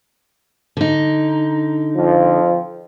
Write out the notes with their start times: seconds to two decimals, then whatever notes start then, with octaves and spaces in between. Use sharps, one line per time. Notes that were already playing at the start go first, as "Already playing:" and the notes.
0.77 D3 D#4
1.96 F2 F3